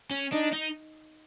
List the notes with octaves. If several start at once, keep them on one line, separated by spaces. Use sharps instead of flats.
C#4
D4 D#4
D#4